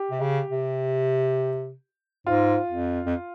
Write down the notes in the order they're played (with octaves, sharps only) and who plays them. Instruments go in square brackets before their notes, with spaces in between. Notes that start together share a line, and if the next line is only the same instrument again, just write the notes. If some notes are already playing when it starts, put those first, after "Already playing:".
Already playing: [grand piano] G4
[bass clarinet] C3
C#3
C3
[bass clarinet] G#2 [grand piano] F4
[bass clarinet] F2
F2